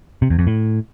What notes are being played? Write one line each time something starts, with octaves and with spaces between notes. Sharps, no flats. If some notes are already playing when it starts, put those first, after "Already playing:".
C3
E2
F2
A2